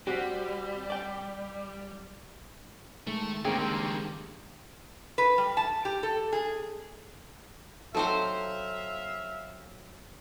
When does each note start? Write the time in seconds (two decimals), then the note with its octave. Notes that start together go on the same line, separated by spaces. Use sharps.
0.07 G3 C4 F#4 G4
0.90 D5 G5
3.07 D#3 G#3 A3 A4
3.45 D3 D#3 G3 G#3 A#3 C4 G#4 G5
5.18 B4
5.38 G3
5.57 A5
5.85 G4
6.03 A4
6.33 G#4
7.95 F#3 C4 D#4 A4 C5 E5 F5